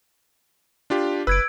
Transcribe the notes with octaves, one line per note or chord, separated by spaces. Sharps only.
D4 F4 G4
F#1 B4 E6 G#6 D7